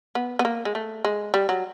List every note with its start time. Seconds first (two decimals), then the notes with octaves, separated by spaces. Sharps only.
0.15 B3
0.39 B3
0.45 A#3
0.65 G#3
0.75 A3
1.05 G#3
1.34 G3
1.49 F#3